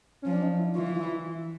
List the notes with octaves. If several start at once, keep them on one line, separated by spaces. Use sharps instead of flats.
F3 C#4
D4
D#4
E4
E3 F4
F4
E4